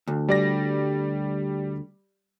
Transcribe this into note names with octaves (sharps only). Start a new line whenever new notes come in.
D2
G3 D5 A#6